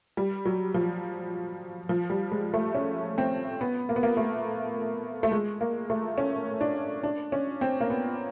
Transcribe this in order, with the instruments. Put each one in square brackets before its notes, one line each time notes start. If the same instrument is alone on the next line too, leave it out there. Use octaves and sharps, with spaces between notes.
[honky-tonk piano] G3
F#3
F3
F3
G3
G#3
A3
C#4
C4
B3
A#3
B3
A#3
A3
A3
G#3
A#3
A3
C#4
D4
D4
C#4
C4
A#3
B3